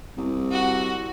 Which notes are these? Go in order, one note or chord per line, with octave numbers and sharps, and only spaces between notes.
C2
F#4